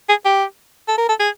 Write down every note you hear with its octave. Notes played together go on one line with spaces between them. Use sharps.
G#4
G4
A4
A#4
A4
G#4